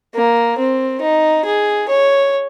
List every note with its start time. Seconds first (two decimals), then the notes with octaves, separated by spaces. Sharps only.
0.14 A#3
0.58 C4
1.01 D#4
1.45 G#4
1.89 C#5